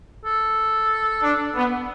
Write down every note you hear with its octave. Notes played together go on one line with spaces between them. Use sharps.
A4
D4
B3